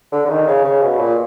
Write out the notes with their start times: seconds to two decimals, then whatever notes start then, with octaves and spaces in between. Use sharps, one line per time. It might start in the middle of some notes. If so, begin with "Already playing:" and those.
0.12 D3
0.25 D3
0.29 D#3
0.47 C#3
0.64 C#3
0.82 B2
0.99 A#2